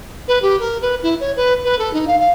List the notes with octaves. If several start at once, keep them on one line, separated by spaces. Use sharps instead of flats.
B4
G4
A#4
B4
E4
C#5
B4
B4
A4
D#4
F5
F5